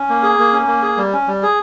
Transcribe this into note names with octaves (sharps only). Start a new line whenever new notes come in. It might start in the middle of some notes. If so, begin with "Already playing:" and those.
Already playing: C#4
A#3
G#4
A#3
C#4
A#3
G#4
G3
C#4
G3
G#4